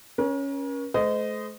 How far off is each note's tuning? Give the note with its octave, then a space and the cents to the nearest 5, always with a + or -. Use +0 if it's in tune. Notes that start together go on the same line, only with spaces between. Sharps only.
C#4 +0 A#4 +45
A3 -40 C5 -30 D#5 +0